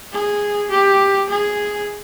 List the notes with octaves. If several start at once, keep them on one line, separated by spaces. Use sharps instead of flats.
G#4
G4
G#4